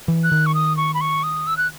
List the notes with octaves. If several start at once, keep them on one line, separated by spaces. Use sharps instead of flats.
E3
F#6
D#3
C#6
D#6
C#6
B5
C#6
D#6
E6
F#6